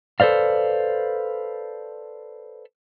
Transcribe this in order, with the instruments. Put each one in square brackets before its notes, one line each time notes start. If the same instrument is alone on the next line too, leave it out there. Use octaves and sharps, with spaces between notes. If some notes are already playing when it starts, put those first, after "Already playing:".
[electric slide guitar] A4 B4 C5 D5 F5